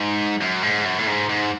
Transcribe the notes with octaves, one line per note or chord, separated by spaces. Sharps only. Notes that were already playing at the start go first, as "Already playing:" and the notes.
Already playing: G#2
F#2
G#2
F#2
A2
G#2
G#2